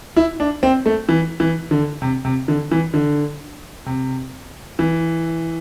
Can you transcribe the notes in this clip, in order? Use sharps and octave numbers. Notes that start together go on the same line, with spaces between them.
E4
D4
C4
A3
E3
E3
D3
C3
C3
D3
E3
D3
C3
E3